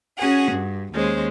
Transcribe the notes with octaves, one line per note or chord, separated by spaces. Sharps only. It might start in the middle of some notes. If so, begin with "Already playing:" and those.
C#4 F#4 G#4 F#5
G2
D#2 G#3 C#4 C5